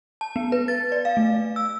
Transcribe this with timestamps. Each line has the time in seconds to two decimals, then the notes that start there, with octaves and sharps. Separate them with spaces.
0.21 A5
0.36 B3
0.52 B4
0.68 A6
0.92 D5
1.05 F5
1.17 A3
1.56 E6